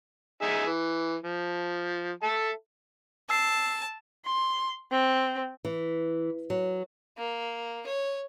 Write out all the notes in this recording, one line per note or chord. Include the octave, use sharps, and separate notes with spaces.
D#4 G#4 E5
E3
F3
A4 E5 A5
A5 E6 C7
C6
C4
E3
F#3
A#3
C#5